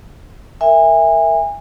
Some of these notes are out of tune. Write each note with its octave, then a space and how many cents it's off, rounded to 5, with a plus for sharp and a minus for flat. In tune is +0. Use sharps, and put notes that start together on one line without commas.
A#4 -10 E5 +0 G#5 -30